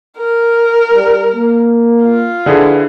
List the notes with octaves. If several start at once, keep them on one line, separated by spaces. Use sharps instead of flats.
A#4
G3
A#3
F4
D3 E4 G#4 B4